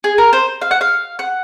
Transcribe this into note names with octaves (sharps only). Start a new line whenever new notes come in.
G#4
A#4
C5
F5
F#5
F5
F#5